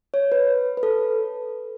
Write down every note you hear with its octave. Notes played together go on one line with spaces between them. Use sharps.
C#5
B4
B4
A4